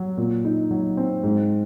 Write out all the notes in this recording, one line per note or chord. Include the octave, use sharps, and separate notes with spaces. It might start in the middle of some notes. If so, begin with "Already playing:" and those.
Already playing: F#3
A#2
D#4
F#3
C4
G#2